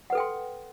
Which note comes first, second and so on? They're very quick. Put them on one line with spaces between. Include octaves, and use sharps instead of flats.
F#5 B4 A4 G5 C6